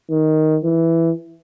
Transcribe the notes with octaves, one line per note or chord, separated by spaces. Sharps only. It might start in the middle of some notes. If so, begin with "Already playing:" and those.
D#3
E3